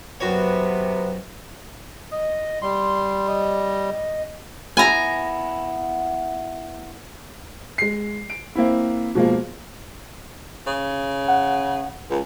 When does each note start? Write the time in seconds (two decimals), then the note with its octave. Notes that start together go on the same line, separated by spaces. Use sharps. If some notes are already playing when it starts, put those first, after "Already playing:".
0.20 F#2 C3 B3 F#4 C#5
2.11 D#5
2.62 G3 C6
2.95 C6
3.28 D#5
4.77 B3 E4 G#5 A#5
7.78 G#3 C7
8.30 D7
8.55 A#3 C4 E4
9.15 B2 F3 G#3 A#3
10.67 C#3
11.28 F#5
12.10 C#2